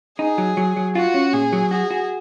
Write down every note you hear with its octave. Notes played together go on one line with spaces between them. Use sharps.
D#4 G#4
F#3
F#3
F#3
F4 F#4
C#4
A#2 G#4
F#3
F#4 G#4
F#4